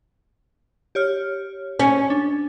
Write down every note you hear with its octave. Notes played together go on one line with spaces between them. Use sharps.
G4 C#5 F6
C#4
D4